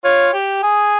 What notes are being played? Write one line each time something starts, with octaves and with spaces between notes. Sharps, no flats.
F4 C#5
G4
G#4